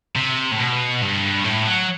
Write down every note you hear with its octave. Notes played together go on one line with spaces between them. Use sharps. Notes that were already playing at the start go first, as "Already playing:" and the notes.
C3
A2
B2
G2
A2
F#3